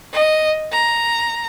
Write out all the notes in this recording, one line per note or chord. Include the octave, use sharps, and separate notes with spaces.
D#5
A#5